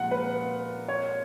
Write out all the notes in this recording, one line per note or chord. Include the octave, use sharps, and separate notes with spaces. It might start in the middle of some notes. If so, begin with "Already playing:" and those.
Already playing: A#2 F3 G#3 F#5
B4
C#5